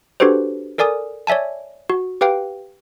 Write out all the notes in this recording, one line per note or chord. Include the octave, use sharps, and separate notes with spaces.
D4 F#4 G4 A4 B4 C5
A4 A#4 D5 G#5 D#6
C#5 D5 E5 G#5 A5
F#4
G4 B4 F5 G5